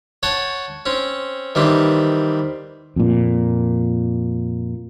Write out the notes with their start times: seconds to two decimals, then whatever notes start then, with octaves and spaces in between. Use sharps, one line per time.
0.23 C#5 F#5 G5 A5
0.86 C4 C#4
1.55 D#3 E3 G3 C4
2.96 F2 A#2